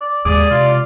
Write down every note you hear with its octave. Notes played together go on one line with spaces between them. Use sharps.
D5
D#2 G#3 C4 G#4 D5
C3 F4